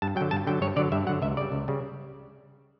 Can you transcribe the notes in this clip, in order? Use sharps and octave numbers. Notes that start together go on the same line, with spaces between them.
G2 A5
D3 F#3 G5
G2 A5
D3 F#3 G5
G2 C#5
D3 F#3 D5
G2 E5
D3 F#3 F#5
C#2 E5
C#3 G3 D5
C#2
C#3 G3